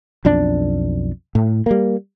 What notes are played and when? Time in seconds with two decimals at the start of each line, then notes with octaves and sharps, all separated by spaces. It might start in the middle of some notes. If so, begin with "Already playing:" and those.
0.25 B1 F2 D4
1.35 A2
1.66 G3 A#3